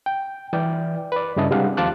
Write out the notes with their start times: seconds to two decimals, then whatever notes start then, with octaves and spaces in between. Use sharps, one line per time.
0.06 G5
0.53 E3 D5 G5
1.12 B4 D5
1.36 G2 C#3 E4 D#5 A5
1.51 C3 G3 G#3 D4 F5 F#5
1.77 D#2 F3 F4 A5 D6 F#6